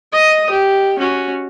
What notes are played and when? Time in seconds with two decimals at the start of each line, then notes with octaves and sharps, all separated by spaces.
0.13 D#5 D#6
0.50 G4
0.98 C#4 F#4